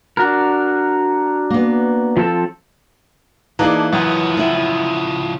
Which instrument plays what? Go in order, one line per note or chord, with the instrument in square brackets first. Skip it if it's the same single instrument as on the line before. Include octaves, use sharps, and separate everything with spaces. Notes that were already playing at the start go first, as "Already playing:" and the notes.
[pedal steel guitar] D4 F#4 A#4
[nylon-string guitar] A#3 B3
[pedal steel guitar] F3 C4 A4
[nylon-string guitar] E3 [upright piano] A#3 G#4 D5 [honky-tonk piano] D#4 F5 A5
[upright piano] F#2 [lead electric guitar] C#3 F3 [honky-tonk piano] F#5
[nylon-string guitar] C4 E4